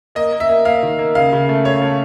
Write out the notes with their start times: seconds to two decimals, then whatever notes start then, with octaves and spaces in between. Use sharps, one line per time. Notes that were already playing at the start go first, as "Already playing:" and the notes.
0.15 A#3 D#5
0.32 A#3
0.40 E5
0.49 A#3
0.65 A#3 F5
0.83 D#3
0.99 A#3
1.15 C#3 F5
1.33 C#3
1.49 A3
1.65 C#3 C#5
1.82 A3